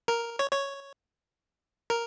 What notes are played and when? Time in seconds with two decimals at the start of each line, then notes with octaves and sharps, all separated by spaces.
0.08 A#4
0.39 C#5
0.52 C#5
1.90 A#4